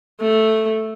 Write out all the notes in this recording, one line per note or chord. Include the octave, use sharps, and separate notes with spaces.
A3